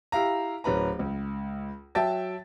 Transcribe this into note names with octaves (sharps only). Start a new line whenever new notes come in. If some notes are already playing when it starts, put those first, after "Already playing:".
E4 G4 F5 A#5
D1 C#4 B4 A#5
C#2
F#3 E5 G5 A5 A6